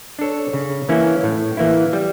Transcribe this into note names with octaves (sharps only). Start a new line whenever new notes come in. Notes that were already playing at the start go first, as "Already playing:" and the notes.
D4 A4 C#5
C#3
E3 A#3 C#4 E4
A2
E3 A#3 E4
G3